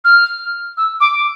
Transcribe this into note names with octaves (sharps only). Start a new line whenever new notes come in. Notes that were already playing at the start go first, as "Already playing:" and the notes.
F6
E6
D6